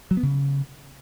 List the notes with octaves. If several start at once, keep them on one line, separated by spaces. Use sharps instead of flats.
F#3
B3
C#3